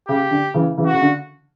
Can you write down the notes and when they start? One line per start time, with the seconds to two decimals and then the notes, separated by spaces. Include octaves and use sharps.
0.08 C#3 G4
0.31 D3
0.54 C#3 E3
0.78 C#3 E3
0.86 F#4
0.92 C#3
1.02 D3